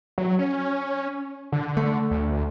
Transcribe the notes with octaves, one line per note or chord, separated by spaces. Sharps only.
F#3
C#4
D3
A3
D2